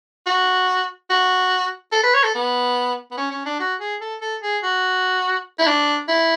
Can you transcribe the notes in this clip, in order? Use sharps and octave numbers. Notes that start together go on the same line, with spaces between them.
F#4
F#4
A4
B4
C#5
A4
B3
B3
C#4
C#4
D4
F#4
G#4
A4
A4
G#4
F#4
E4
D4
E4